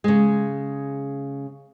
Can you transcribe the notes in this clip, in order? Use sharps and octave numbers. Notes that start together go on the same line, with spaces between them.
C#3 G#3